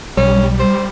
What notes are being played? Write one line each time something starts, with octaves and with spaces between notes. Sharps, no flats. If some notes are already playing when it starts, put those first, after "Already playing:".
B1 G3 C#4
C5